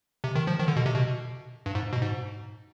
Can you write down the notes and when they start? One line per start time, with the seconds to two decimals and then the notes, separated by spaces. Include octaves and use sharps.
0.24 C3
0.35 D#3
0.47 F3
0.59 D#3
0.68 D3
0.76 B2
0.86 C3
0.95 B2
1.66 G2
1.75 G#2
1.93 B2
2.02 G#2